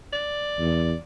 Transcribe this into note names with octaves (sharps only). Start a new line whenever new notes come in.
D5
E2